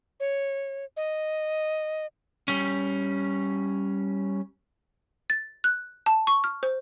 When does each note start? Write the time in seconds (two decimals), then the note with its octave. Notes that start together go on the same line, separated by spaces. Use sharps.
0.20 C#5
0.97 D#5
2.48 G3 C#4
5.30 A6
5.64 F#6
6.06 A5
6.27 C#6
6.44 F6
6.63 C5